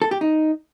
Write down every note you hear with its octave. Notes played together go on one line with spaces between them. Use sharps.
A4
G4
D#4